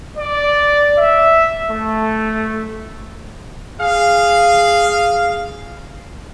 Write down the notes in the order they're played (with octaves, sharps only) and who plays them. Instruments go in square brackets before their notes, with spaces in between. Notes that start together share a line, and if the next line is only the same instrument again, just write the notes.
[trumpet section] D5
E5
A3
[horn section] G#4 F5